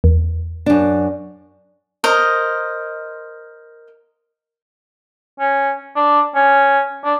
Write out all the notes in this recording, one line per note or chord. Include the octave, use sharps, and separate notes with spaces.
E2
F#2 D4
A#4 C5 D#5
C#4
D4
C#4
D4